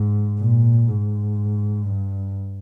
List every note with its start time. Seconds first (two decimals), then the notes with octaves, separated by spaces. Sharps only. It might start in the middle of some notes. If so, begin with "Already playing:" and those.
Already playing: G#2
0.40 A#2
0.88 G#2
1.84 G2